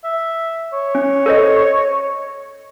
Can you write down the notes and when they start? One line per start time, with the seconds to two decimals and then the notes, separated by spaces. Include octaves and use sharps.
0.04 E5
0.73 C#5
0.95 C#4
1.26 A4 C5 D#5